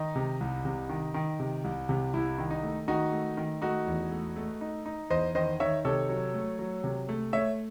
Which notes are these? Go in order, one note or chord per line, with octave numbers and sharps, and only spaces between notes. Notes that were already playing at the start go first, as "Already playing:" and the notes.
Already playing: D#3 D#4
C3
C2
C3
D#3
D#3
C3
C2
C3
C2 E4
D#3
D#4
A3
D#3 D#4 F#4
A3
D#3
A3 D#4 F#4
E2
A3
A3
D#4
D#4
E2 C5 D#5
D#3 C5 D#5
D#3 C#5 E5
C3 A4 C#5
F#3
A3
F#3
C3
A3
A3 C#5 E5